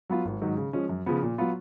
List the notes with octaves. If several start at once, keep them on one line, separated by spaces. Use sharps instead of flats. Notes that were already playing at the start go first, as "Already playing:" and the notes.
F#3 B3 F4
G#1
G#2 D#3 F#3
C#3
F3 G#3 C#4
F#2
C#3 F3 B3
A#2
F#3 B3 F4